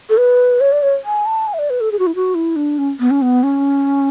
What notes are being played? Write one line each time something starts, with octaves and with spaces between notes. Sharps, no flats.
A4
B4
C#5
D5
C#5
G#5
A5
G#5
E5
D5
B4
A4
G#4
F#4
E4
F#4
E4
D4
C#4
B3
C#4
B3
C#4